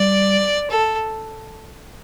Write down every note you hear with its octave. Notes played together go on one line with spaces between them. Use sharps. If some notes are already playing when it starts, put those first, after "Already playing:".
Already playing: G3 D5
A4